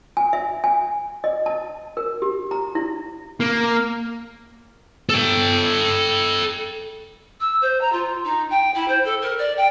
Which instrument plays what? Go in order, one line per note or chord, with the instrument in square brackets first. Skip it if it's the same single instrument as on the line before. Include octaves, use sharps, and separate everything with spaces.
[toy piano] G#5
E5
G#5
D#5
A5
A#4
G4
A#5
E4
[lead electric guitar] A#3
[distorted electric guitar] A4 G5
[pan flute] E6
C5
A#5
F4
D#4
G5
E4
C5
A4
A#4
D5
G5